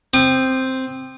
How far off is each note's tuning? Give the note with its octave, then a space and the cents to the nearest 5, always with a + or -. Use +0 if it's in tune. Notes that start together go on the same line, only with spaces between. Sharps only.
C4 +0 D#6 -40